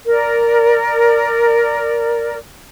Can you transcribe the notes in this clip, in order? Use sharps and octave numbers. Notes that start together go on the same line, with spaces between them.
A#4 D5